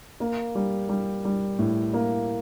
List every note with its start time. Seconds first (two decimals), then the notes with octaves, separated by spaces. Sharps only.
0.20 A#3
0.55 G3
0.89 G3
1.25 G3
1.59 A2
1.94 A#3